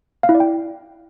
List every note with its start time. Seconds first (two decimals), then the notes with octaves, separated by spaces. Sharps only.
0.23 F5
0.29 E4
0.35 D5
0.40 G5